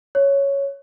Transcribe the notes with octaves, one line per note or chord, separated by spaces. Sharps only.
C#5